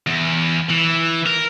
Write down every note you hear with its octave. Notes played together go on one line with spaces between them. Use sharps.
E2
E3
A#4